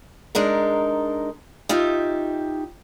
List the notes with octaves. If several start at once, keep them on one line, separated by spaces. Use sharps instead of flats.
G#3 D4 D#4 A#4
D#4 F4 G4 E5